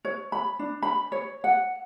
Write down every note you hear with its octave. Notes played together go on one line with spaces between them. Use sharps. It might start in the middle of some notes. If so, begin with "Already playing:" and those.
C#5
B5
D4
B5
C#5
F#5